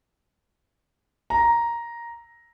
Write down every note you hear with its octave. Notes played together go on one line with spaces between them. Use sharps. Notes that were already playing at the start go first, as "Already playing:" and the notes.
A#5